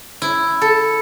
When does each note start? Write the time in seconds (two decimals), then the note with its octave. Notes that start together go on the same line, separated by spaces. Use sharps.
0.22 E4
0.61 A4